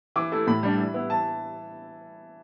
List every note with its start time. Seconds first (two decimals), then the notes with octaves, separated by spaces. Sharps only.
0.16 E3 D6
0.32 A3 E4
0.47 A2 B5
0.63 G3 D4
0.78 E3
0.94 B3 E4
1.10 E3 A5